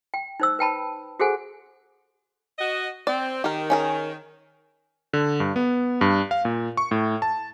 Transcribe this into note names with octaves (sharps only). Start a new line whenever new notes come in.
G5
D#4 C5 E6
B4 G5 A5 B5
F#4 G#4 A4 C5 F#5 G#5
F#4 D#5
C4 D5
D#3 G4 A#4
C#4 G#4 A#4
D3
G2
B3
G2
F5
A#2
C#6
A2
A5